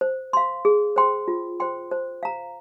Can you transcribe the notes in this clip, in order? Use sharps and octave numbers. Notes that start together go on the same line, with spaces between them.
C5
F5 C6
G#4
C5 G5 C6
F4
C5 G5 C6
C5
F5 A#5